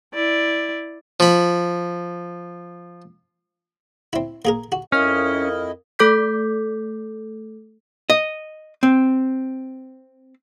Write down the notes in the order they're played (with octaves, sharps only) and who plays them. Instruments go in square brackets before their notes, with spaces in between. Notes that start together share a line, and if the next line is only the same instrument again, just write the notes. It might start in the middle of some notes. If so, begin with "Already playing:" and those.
[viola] E4 D5
[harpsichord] F3 B5
C4 E4
A#3 G#4 A#4
F#4
[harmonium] F2 E4 D#5 [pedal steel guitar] C#4 [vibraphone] A#4 F5 D#6 [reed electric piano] F6
[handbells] A3 A4 D6 G6 B6
[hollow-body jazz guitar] D#5
C4